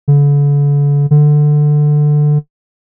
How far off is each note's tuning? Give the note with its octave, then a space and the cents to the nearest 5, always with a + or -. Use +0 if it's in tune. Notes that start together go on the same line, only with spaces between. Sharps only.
D3 -40
D3 +15